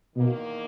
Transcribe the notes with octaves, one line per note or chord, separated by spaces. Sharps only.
E2 B2 D#3 A#3